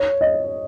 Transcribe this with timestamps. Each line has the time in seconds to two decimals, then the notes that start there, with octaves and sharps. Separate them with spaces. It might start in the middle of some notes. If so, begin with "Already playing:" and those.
Already playing: C#5
0.21 D#5